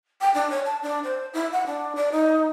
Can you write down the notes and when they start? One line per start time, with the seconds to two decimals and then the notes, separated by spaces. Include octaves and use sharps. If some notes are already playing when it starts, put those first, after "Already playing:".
0.21 G5
0.34 D4
0.50 C#5
0.65 A5
0.82 D4
1.04 C5
1.34 E4
1.52 F#5
1.67 D4
1.96 D5
2.12 D#4